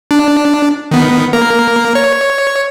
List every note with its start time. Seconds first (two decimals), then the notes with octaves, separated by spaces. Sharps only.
0.11 D4
0.91 D#3 B3
1.33 A#3 A#4
1.95 C#5